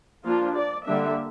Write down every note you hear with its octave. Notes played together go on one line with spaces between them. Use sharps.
F3 A#3 D4 F4
D5
D3 G3 A#3 D4 E5